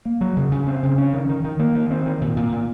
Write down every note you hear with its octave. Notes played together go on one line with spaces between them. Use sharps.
A#3
F#3
C#3
C#3
C4
C#3
C#4
D#3
D#3
D#3
A#3
D#3
C4
D#3
A#2
A#2
A#2